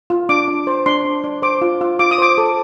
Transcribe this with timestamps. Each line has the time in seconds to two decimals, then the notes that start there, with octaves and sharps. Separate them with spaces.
0.10 F4
0.29 D4 D6
0.48 D4
0.67 C5
0.86 D4 C6
1.05 D4
1.24 D4
1.42 C5 D6
1.62 F4
1.81 F4
1.99 F4 D6
2.11 D#6
2.18 C5 D6
2.38 A4